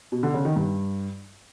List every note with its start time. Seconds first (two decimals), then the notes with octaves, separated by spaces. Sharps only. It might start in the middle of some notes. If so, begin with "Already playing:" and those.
0.12 B2
0.23 D3
0.34 C#3
0.45 D#3
0.56 G2